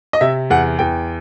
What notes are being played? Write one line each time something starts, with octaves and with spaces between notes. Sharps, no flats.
D#5
C3 E5
E2 F#5
E2 G5